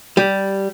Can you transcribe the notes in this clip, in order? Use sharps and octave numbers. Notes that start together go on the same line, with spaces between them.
G3